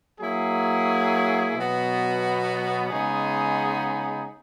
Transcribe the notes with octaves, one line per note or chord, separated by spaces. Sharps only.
F#3 A#3 E4 G#4
B2 F#3 B3 F#4
C#3 G#3 B3 D#4 G#4